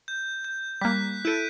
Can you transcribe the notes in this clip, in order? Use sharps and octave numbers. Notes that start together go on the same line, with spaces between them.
G6
G6
G3 A#3 F#6 B6
E4 A4 G6 D7 D#7